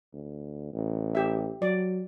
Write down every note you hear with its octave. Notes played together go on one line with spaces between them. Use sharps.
D2
A1
G4 E5
F#3 D5